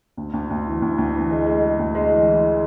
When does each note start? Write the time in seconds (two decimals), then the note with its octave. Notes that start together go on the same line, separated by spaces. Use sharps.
0.17 D2
0.34 D2
0.50 D2
0.66 E3
0.82 D2
0.98 D2
1.14 E3
1.31 G#3
1.46 G#3
1.62 G#3
1.79 D2
1.95 G#3
2.12 E3
2.27 E3